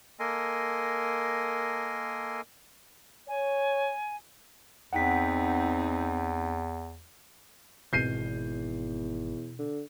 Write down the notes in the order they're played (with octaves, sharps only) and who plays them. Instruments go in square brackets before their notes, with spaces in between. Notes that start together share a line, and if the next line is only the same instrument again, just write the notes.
[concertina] A#3 A4 A#4 D#5 G#5 C6
[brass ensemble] C#5 [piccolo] G#5
[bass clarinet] E2 [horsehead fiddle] C4 D#4 [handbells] F#5 G5 B6
[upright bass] G#1 D#3 [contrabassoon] E2 [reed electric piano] B2 [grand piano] G6 C7 D#7
[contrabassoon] D3